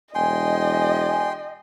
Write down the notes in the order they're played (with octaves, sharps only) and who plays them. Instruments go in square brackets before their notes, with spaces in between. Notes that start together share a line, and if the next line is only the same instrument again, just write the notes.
[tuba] E1 [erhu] D#5 [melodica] G5 C6 [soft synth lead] G#5